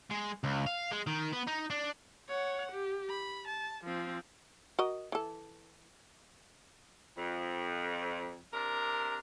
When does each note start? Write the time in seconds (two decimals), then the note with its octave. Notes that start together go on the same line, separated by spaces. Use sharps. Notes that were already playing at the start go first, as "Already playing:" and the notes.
0.10 G#3
0.44 C#2
0.66 F5
0.92 G#3
1.07 D#3
1.32 B3
1.47 D#4
1.70 D4
2.29 C#5 F#5
2.72 G4
3.10 B5
3.48 A5
3.84 F3 C4
4.79 F#4 A#4 D#5
5.12 E3 A4
7.16 F2
8.52 C3 D4 A#4